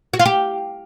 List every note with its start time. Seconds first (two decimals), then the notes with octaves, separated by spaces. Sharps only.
0.14 F#4
0.20 F4
0.26 G4